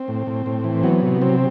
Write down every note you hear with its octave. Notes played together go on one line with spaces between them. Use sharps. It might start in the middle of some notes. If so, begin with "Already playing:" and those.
Already playing: C4
A2
A2
A2
E3
F#3 B3
C3
F#3 C4